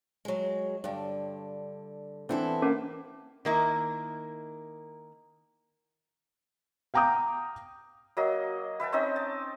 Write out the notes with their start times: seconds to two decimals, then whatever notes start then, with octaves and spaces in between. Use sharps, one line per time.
0.25 F#3 G#3
0.84 G2 D3
2.29 E3 B3 C4 D4 E4 A4
2.62 A#3 C#4
3.45 D#3 A#3 E4
6.94 F5 G5 A#5 D6 D#6 G6
8.17 F#3 A#3 D#5
8.80 B4 E5 G5 A5
8.92 C4 C#4 D#4 D#5
9.16 A5